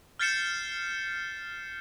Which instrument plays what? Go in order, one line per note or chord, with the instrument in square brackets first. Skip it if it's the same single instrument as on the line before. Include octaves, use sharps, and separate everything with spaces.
[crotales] F6 G6 A6 C7 C#7 E7